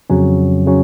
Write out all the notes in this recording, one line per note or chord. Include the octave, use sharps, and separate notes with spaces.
F2 C#3 F#3 C#4
C#3 F#3 C#4